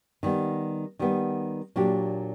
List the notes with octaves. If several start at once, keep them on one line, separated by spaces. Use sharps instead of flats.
D#3 G3 B3
D#3 G3 B3
A#2 F#3 A#3 D4 G4